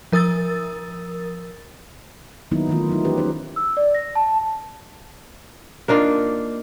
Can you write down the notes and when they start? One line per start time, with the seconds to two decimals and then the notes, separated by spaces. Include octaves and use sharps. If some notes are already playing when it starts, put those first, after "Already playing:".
0.12 F3 A#4 D#6 E6 A6
2.51 D#3 F#3 A#3 B3 D#4 E4
2.69 D#3 E3 F#3 A3 B3 F4
2.90 F#3 G#3 D#4 E4
3.05 E3 G3 C#4 G4 B4
3.18 C#4 D#4 C5
3.56 E6
3.77 D5
3.95 A#6
4.15 A5
5.88 A#3 D4 D#4 F4